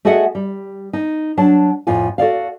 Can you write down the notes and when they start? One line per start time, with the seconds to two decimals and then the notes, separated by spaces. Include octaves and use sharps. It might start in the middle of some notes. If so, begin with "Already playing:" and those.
0.05 A3 F#4 G#4 D#5 E5 F#5
0.35 G3
0.93 D#4
1.37 F#3 D4 A5
1.87 F2 A2 F4 G#5
2.18 F#4 A4 D5 F5